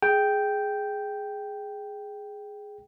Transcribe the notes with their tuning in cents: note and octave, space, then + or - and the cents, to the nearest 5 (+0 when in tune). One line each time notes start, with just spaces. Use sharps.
G#4 +5 G5 +0